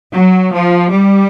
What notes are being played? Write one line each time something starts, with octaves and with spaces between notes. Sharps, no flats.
F#3
F3
G3